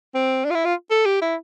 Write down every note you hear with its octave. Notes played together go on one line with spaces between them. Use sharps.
C4
D4
F4
E4
F4
A4
G4
E4